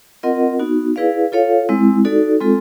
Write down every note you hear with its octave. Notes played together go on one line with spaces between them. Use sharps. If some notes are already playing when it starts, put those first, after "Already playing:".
C4 F4 A#4 D#5 F#5
B3 D#4 F#4
E4 G#4 B4 D5 F5
F4 A4 C#5 F5
G#3 C4 E4
D#4 F#4 A4 D5
G#3 C4 F4 A4